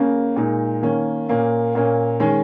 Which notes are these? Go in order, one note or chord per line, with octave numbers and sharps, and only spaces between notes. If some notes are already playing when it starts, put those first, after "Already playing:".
Already playing: C#3 A#3 C#4
A#2 G#3 D#4
D#3 A#3 C#4
A#2 A#3 C#4
A#2 A#3 C#4
D#3 G#3 C#4